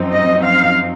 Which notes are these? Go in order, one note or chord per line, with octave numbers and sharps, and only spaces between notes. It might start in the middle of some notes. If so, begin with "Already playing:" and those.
Already playing: F#2 F3 C4 D#4
D#5
F5